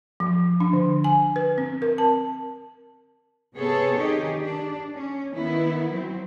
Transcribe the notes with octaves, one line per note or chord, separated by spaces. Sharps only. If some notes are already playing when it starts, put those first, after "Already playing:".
F3
D4
D3
G#5
B4
C4
A#4
A5
C3 B3 G#4 A4 C#5
D#3 D#4 G4 G#4
D4
C#4
D#3 B3 E4
F#3 C4